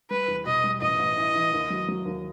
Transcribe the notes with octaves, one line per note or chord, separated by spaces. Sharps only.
G3 B4
E2
B2 D#5
G3
A1 D#5
A1
E3
E3
D#2
F#3
F#3
D#2